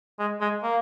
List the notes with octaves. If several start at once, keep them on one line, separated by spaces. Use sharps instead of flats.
G#3
G#3
A#3